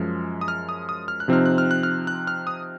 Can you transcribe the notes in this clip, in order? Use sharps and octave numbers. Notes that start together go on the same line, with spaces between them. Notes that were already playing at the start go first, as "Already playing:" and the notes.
Already playing: F#2 F3 G#3 F6
D#6
F6
D#6
D#6
F6
F#6
C3 F3 C4 D#4 F6
F#6
F6
F#6
F6
F#6
F6
D#6